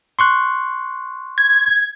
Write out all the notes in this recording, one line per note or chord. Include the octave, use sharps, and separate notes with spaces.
C6 C#6 F#6
G#6